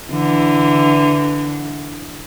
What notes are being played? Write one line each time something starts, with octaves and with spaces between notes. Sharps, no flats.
D3 E3